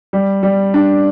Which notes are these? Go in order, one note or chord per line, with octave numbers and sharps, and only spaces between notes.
G3
G3
D4